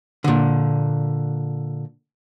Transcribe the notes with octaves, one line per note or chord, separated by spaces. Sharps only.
A#2 D3